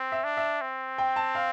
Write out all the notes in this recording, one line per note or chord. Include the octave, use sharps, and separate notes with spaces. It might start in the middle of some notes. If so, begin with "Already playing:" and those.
Already playing: C4
E5
D4
E5
C4
G5
A5
F5